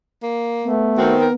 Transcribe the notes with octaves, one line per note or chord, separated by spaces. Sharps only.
A#3
A3 B3
D#3 C4 F#4
A#4